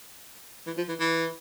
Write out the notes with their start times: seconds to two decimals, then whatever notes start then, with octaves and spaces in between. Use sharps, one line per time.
0.67 E3
0.77 F3
0.89 E3
1.00 E3